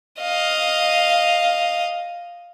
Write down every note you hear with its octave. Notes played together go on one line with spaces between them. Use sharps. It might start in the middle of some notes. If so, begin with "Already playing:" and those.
D#5 F5